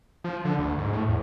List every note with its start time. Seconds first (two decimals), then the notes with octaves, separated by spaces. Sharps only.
0.24 F3
0.45 D3
0.59 D2
0.78 G#2
0.93 A2
1.08 E2